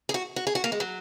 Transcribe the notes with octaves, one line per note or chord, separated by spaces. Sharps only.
G#4
F#4
F#4
G#4
F#4
A#3
G#3
F#3